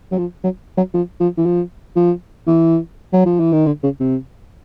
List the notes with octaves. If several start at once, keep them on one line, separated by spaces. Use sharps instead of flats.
F#3
F3
F#3
F#3
F3
F3
E3
F3
F3
E3
F#3
F3
E3
D#3
D3
C#3
C3